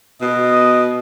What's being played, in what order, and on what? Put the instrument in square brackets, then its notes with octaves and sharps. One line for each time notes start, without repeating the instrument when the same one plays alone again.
[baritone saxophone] B2 [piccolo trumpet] D#5